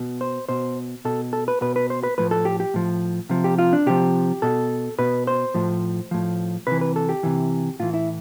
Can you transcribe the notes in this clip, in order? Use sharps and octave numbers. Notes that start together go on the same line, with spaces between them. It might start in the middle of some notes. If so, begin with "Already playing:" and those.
Already playing: B2
C5
B2 C5
B2 A4
A4
B4
B2 B4
B4
C5
B4
A2 F3 B4
A4
G4
G4
A2 F3
C3 F3
G4
F4
D4
C3 F3 G4
B2 A4
B2 B4
C5
A2 F3
A2 F3
C3 E3 B4
B4
A4
G4
C3 E3
A2 E3 F4
E4